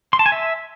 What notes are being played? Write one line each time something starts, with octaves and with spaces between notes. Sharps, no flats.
C6
A5
G#5
E5